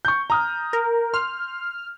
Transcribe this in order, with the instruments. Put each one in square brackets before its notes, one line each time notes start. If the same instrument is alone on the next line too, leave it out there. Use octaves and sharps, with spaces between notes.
[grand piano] C#6 G6
A#5 D#6 F6
[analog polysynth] A#4
[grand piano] C6 [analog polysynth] F6